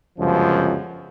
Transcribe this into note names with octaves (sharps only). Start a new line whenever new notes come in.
G1 C#2 F#2 F3